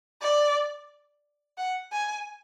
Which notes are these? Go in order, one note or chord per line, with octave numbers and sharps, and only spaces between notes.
D5
F#5
G#5